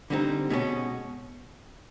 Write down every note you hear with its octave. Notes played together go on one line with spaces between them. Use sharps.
D3 G3 C4 D#4
B2 G#3 C#4